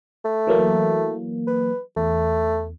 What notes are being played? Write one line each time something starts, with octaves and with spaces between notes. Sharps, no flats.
A3
E3 F#3 A#3
B4
E2 A3